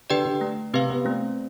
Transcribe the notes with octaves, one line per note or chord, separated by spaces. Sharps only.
D3 G4 B4 D5 G5
D3
A3
C3 C4 G4 B4 F5
B3
A3 C4